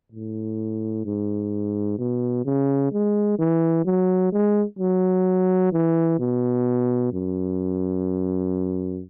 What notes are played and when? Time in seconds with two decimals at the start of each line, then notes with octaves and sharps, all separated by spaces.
0.12 A2
1.05 G#2
1.98 B2
2.45 C#3
2.92 G#3
3.39 E3
3.85 F#3
4.32 G#3
4.79 F#3
5.73 E3
6.19 B2
7.13 F#2